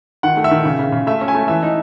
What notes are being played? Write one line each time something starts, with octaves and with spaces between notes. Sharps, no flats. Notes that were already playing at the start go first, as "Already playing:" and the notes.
D#3 F#5
A3
E5
D#3
C#3
C#3
C#3
A3 E5
C#4
G#5
A3
E3 E5
D#4